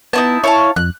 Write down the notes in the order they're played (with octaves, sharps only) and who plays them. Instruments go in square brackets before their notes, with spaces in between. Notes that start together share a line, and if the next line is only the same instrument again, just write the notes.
[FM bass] B3 [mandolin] D#4 E4 A5
[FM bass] E4 [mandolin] C#5 F5 A5
[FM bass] F2 [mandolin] F#6